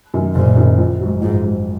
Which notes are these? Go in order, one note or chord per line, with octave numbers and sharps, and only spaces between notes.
F#2 D#3
F#1 A#2
F#2 D#3
A#1
G#2 F#3
A#1 G#2
G#2 F#3